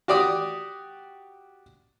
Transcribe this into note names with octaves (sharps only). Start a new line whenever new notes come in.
F#4 G4 D5 D6 D#6